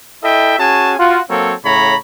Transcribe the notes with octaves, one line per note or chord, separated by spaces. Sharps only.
E4 A4 D#5 E5 G5
C#4 F#4 G#4 G#5 A5
F4 F#4
F#3 A#3 C4 A4 C#5
A2 C#3 C#5 A#5 B5